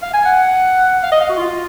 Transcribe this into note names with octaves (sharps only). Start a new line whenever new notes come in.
F5
G#5
F#5
F5
D#5
F5
F#4
F4